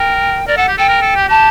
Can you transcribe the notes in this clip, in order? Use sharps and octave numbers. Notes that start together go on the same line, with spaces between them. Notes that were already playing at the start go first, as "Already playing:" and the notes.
Already playing: A#4 G5
A#4 D5
A4 F#5
G4
A4 G5
A#4
A4
G4
G4 A5